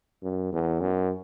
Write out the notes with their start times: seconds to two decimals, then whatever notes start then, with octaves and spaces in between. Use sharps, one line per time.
0.23 F#2
0.52 E2
0.81 F#2